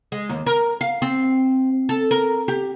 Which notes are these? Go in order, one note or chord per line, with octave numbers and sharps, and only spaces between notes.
G#3
D#2
A#4
F5
C4
A4
A#4
G4